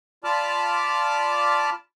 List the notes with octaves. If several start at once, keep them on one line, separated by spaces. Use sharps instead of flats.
F4 D5 A5 B5 D6 F6